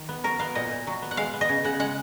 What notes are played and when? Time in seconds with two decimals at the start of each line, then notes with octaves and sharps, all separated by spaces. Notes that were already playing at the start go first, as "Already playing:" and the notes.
Already playing: D#3
0.09 B3
0.24 F#3 A#4
0.39 B3 F5
0.55 A#2 D#5
0.71 A#2
0.87 F#3
1.02 B3
1.11 F#5
1.17 G#3 F5
1.34 B3
1.41 D#5
1.49 C#3
1.64 C#3 F#5
1.79 G#3 F#5